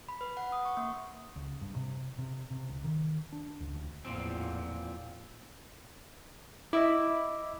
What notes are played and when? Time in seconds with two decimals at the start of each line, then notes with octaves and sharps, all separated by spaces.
0.09 B5
0.21 B4
0.37 F#5
0.52 D#6
0.65 C#6
0.77 A#3
1.36 C#2
1.61 G2
1.76 C3
2.18 C3
2.51 C3
2.69 C#2
2.84 D#3
3.33 D4
3.60 C#2
3.73 D2
4.05 A1 E2 A#2 F3 C4
6.73 E4 D#5 E5 D6